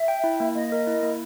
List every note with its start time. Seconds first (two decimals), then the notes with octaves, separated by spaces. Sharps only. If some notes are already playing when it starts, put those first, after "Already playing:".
Already playing: E5
0.08 G5
0.24 E4
0.40 A#3
0.55 A#3 D#5
0.72 A#4
0.87 E4
1.03 A#3